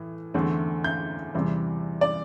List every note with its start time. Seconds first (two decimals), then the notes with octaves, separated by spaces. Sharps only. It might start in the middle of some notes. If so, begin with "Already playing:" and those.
Already playing: A2 E3
0.34 E2 D3 A3 C4
0.84 G6
1.35 E2 C3 E3 G3 C4
2.01 D5